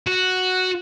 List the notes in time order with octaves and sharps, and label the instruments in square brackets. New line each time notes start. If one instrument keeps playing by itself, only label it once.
[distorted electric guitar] F#4